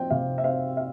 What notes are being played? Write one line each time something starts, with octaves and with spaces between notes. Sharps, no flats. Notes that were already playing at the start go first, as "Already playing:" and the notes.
Already playing: F3 C4 G5
C3 F5
E5
C4 F5
F5